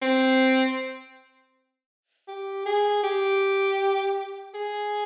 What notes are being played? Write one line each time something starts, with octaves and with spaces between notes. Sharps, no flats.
C4
G4
G#4
G4
G#4